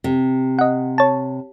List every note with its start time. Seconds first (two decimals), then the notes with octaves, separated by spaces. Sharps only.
0.04 C3
0.59 D#5 F#5
0.98 C#5 A5